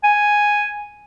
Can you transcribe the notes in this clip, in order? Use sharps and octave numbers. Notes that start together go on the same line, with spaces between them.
G#5